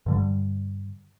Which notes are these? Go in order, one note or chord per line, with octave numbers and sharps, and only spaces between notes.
G2 D3 G3